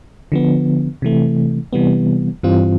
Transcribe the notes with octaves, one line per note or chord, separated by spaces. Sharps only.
D3 F3 B3
C3 E3 A3
C3 E3 G3 B3
G2 E3 G3 C4 F4